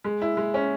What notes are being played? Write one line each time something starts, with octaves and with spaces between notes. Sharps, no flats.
G#3
E4
G#3
C#4